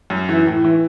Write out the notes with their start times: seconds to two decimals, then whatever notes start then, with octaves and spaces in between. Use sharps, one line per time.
0.10 F#2
0.29 E3
0.46 A2
0.64 E3